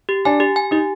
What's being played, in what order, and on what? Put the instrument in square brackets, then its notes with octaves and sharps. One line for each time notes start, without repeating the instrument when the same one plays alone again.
[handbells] G4
[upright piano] D4 [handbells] G#5
[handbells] G4
G#5
[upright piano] D#4 [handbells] G4